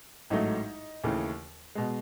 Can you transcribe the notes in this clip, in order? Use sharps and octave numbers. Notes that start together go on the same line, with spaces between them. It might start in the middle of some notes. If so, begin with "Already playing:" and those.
A1 G#2 F#3 A3 D#4
D#2 C#3 E3 A3
B2 G#3